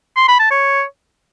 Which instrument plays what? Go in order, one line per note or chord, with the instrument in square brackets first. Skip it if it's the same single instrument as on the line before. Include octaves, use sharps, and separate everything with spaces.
[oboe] C6
B5
A5
C#5